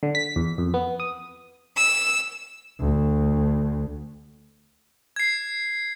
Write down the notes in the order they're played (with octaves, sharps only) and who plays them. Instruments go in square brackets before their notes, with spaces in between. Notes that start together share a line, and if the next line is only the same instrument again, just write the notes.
[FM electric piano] D3
B6
E2
F2
B3
D#6
[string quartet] E6
[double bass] D2
[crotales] G#6 C7